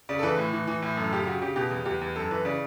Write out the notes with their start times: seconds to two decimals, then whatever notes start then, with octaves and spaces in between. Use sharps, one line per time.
0.09 C#3 D5
0.19 A4
0.23 E3 B4
0.38 A2
0.53 E3
0.68 E3
0.82 A2
0.97 F#2 A4
1.13 C#3 G4
1.26 C#3 F#4
1.42 C#3 G4
1.56 B2 G4
1.71 E2
1.85 E2 G4
2.01 E2
2.16 F#2 A4
2.31 E3 B4
2.45 C#3 D5